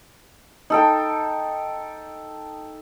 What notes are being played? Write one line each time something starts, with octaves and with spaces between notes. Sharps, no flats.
D#4 A4 G5